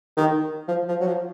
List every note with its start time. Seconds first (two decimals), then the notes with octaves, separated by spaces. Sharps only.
0.17 D#3
0.68 F3
0.88 F3
1.01 F#3
1.07 F3